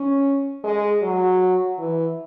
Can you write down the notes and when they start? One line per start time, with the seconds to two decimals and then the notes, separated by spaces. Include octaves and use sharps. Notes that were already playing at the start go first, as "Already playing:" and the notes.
Already playing: C#4
0.64 G#3
1.02 F#3
1.78 E3